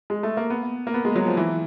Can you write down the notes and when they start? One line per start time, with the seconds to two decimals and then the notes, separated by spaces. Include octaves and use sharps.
0.10 G#3
0.23 A3
0.37 A#3
0.50 B3
0.87 A#3
0.94 B3
1.05 G#3
1.16 F#3
1.27 F3
1.37 E3